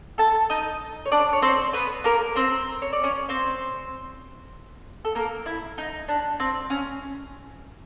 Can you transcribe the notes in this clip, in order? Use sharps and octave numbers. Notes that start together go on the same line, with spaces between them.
A4 A5
D#4 D#5
C#5
D4 D5
C#5
C4 C5
B3 B4
A#3 A#4
C4 C5
C#5
D5
C#4 C#5
C4 C5
A4
A#3 A#4
E4
D#4
D4
C4
C#4